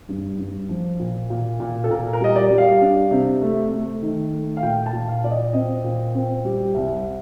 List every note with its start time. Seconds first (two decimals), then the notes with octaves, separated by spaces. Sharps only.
0.09 G2
0.38 G2
0.69 F3
0.99 A#2
1.30 A#2
1.60 A#2
1.84 A4
1.90 A#2 A#4
2.13 A#4
2.21 G3 D#5
2.36 D5
2.51 G3
2.58 F5
2.81 D4
3.11 C3
3.42 A3
3.72 A3
4.02 D#3
4.33 A3
4.57 F5
4.63 A#2 G5
4.86 A5
4.93 A#2
5.08 F5
5.24 A#2 D5
5.31 D#5
5.53 C4 D#5
5.84 A#2
6.15 C4
6.45 G3
6.74 C2